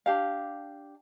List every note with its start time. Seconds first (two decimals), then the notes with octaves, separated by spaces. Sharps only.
0.06 D4 G4 F5